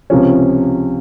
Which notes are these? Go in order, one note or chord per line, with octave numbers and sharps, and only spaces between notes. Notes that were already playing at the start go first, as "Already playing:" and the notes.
C#2 C3 F3 C#4